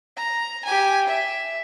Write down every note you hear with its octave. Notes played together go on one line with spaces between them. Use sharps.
A#5
G4 G#5
E5